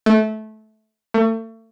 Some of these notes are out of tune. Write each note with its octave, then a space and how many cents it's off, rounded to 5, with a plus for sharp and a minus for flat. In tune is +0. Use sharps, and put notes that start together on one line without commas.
A3 -20
A3 +35